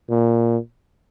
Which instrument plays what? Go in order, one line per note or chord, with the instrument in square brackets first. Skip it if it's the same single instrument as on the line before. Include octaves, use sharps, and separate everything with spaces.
[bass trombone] A#2